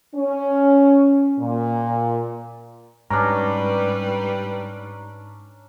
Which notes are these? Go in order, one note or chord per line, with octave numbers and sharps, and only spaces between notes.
C#4
A#2
G#2 G3 C#4 D4 B4 A#5